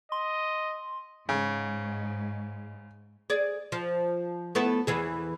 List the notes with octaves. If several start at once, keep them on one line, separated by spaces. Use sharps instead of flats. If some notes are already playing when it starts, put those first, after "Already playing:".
D#5 C6
G#2 C#3
G#4 D5
F3
A3 B3 E4
E2 E3 G#4